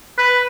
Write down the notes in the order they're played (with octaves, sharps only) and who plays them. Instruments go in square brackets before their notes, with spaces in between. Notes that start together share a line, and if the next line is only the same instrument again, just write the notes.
[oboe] B4